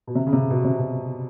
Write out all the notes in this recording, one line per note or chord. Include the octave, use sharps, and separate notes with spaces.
B2
C3
C#3
C3
B2
C3
B2